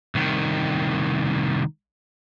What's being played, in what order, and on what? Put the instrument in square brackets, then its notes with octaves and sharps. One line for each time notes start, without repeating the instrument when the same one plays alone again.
[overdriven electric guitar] C2 D#3